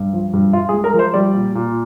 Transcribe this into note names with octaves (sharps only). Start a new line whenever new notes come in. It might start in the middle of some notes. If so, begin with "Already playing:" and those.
Already playing: G2
F3
G2
G2 F4
G#4
G#3
A#4
F3
C5
G3 D5
A#2
A#2